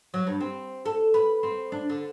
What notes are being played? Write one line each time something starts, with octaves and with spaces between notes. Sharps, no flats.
F#3
G2
C4
A4
B4
C4
D4
D3